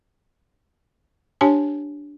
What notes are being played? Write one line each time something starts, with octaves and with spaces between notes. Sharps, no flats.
D4 G4 C#5 G#5 A5